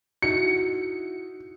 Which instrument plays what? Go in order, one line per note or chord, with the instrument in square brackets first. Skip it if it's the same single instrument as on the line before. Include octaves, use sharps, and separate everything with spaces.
[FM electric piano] D#4 E4 F#4 [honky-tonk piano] C#7